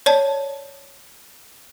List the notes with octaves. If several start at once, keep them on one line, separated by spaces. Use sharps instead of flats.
C#5 D5 A5